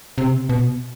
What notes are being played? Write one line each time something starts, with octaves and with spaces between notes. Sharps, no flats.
C3
B2